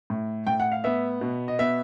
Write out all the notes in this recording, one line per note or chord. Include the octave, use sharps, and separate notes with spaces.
A2
A2 G5
F#5
F5
B3 E5
B2
D#5
B3 E5